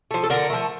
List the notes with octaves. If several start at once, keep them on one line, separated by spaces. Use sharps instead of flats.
F3 A3
A4
D3 A#4
F3 A3